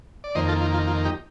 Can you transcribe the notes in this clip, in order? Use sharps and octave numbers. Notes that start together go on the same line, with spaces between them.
D5
F2 D#3 A#3 C5 D#5
F4 A4
F4
F4
F4
D#4 G4